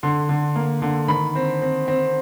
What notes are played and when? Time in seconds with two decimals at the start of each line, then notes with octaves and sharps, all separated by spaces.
0.03 D3 C6
0.29 D3
0.56 A#3
0.82 D3
1.08 D#3 B5
1.35 C4
1.62 C4
1.88 C4